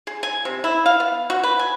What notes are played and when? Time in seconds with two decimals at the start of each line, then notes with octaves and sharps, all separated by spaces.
0.07 G#4
0.23 G#5
0.45 C3
0.64 E4
0.86 F5
1.00 B3
1.30 F#4
1.44 B4
1.59 G#5